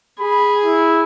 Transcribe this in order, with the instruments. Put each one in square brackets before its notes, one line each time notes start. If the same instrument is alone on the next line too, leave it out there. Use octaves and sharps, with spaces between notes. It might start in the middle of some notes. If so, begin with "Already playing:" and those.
[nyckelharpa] G#4 [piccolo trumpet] B5
[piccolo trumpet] E4